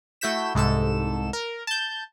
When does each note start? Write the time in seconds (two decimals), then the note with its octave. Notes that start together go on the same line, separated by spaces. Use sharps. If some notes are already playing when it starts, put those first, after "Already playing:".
0.21 A3 E4 F#4 G6 B6 E7
0.55 C2 G#2 A4 E7
1.33 A#4
1.67 A5 G6